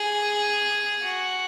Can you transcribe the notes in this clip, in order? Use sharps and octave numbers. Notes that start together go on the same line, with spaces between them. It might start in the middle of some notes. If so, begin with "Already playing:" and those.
Already playing: G#4
F#4